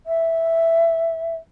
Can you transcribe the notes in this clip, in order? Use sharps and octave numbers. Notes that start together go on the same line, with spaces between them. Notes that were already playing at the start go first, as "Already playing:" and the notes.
E5